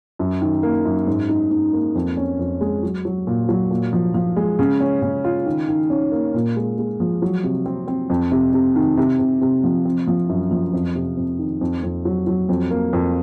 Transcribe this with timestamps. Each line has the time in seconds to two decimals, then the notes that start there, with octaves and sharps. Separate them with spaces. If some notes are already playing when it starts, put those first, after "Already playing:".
0.19 F#2
0.42 D#3
0.63 A#3
0.85 F#2
1.07 G#2
1.29 D#4
1.51 G#2
1.73 A#3
1.95 F2
2.17 C#4
2.39 F2
2.61 G#3
2.83 F#3
3.05 F#3
3.27 A#2
3.49 F#3
3.71 A#2
3.93 F3
4.14 F3
4.36 G#3
4.59 C#3
4.80 C#4
5.02 C#3
5.24 F4
5.46 D#3
5.68 D#3
5.90 C#4
6.12 A#3
6.34 A#2
6.56 G#3
6.78 G#3
7.00 F3
7.22 F#3
7.44 C3
7.66 C4
7.88 C4
8.10 F2
8.32 C3
8.53 C3
8.76 D#3
8.97 C3
9.19 C3
9.41 C3
9.64 F3
9.85 C4
10.07 F3
10.29 F#2
10.51 F3
10.73 F2
10.95 C3
11.17 F2
11.39 D#3
11.61 F2
11.83 F2
12.05 F#3
12.27 F#3
12.49 F2
12.71 A#3
12.93 F2